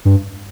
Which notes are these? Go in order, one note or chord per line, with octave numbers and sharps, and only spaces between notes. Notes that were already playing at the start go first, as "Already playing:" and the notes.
G2